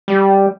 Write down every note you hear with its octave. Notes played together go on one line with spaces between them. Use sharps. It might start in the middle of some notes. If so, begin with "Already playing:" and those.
G3